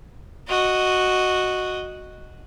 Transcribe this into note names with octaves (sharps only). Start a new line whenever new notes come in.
F#4 D#5